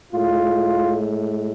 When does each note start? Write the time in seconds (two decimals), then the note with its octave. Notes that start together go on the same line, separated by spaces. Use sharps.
0.13 A2 G#3 F4